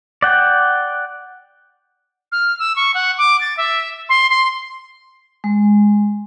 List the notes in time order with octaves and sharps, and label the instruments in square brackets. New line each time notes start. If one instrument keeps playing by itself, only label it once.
[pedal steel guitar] D5 F#5 G5
[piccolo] F6
E6
C#6
F#5
D6
A6
E5
C6
C6
[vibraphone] G#3